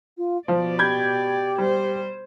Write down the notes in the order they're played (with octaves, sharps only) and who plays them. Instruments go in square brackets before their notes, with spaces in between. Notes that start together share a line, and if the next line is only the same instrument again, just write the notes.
[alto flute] F4
[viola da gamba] B2 D5 [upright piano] F3 [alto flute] C5
[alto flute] G4 [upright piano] B5 G6 G#6
[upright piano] G3 [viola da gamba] C5